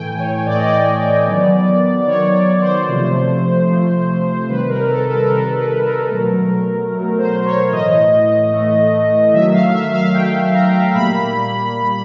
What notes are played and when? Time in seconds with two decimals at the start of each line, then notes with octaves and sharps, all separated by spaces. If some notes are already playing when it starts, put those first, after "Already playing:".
Already playing: A2 E3 A3 G5 G#5
0.19 C#5
0.45 A2 E3 A3 D5
0.56 D#5
0.65 D5
1.27 D#3 F#3 B3
2.07 D#3 F#3 B3 C#5
2.34 C#5
2.61 C5
2.88 C3 F3 A3
3.69 C3 F3 A3
4.49 C3 D#3 G3 B4
4.69 A#4
4.90 A4
5.10 A4
5.30 C3 D#3 G3 A#4
5.56 B4
5.84 A#4
6.10 B2 F#3 A3
6.91 B2 F#3 A3
7.18 C5
7.45 C#5
7.72 A2 E3 A3 D#5
8.53 A2 E3 A3
9.33 D#3 F#3 A3 E5
9.53 F5
9.74 E5
9.94 F5
10.13 D#3 F#3 A3 G5
10.54 A#5
10.95 A#2 G3 A#3 B5
11.75 A#2 G3 A#3